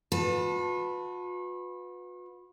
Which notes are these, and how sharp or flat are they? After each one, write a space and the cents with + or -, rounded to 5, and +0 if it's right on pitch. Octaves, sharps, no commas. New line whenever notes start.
F#4 -45 B4 +0 A5 +0